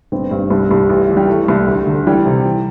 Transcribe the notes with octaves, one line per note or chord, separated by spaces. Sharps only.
G1 C4
G2
C2
C2
A1
E3
G3
E3 A3
C2
D2
D3
E3 G3
C3
E3